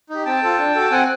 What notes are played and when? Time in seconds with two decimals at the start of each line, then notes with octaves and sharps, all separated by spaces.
0.10 D#4 G4
0.25 C4 G5 A5
0.42 F4 A4
0.59 D4
0.75 F#4 A4
0.82 A5
0.91 C4 F#5 G#5